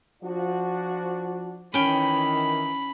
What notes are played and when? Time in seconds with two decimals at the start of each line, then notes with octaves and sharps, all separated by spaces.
0.23 F3 D4 F#4
1.74 D#3 E3 C#4 G5 B5